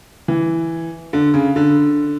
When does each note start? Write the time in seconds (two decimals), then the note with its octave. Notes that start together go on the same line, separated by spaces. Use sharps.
0.28 E3
1.13 D3
1.34 C#3
1.56 D3